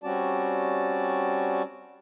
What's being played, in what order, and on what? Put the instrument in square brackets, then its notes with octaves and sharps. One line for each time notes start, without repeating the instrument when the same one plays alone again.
[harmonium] G3 C4 C#4 F#4 D5 A5